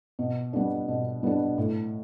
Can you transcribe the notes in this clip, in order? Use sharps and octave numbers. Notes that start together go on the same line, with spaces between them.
B2
G3 B3 D4
B2
G3 B3 D4
A2